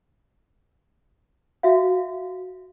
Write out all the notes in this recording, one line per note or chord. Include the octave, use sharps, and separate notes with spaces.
F#4 E5 F5